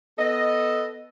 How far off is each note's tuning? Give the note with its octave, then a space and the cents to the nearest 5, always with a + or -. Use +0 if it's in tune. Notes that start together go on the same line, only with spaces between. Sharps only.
B3 +0 A4 -5 D#5 +0